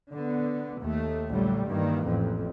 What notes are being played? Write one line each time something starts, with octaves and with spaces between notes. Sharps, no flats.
D3 B3
D#2 A3
A#1 D3 F#3 G3 A3
G2 D#3 E3 A#3
A1 F2